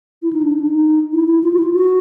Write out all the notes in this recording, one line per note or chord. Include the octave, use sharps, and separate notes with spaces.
E4
D#4
D4
D#4
D4
D#4
E4
E4
F4
F#4
E4
F4
F#4